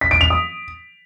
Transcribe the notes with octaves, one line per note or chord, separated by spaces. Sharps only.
B6
D7
F7
D#6